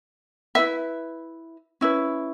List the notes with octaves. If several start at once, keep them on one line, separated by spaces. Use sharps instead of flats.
E4 B4 E5
C#4 E4 B4